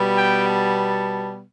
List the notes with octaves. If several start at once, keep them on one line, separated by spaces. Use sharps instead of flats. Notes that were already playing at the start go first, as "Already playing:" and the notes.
Already playing: B2 G3 B3
G5
A5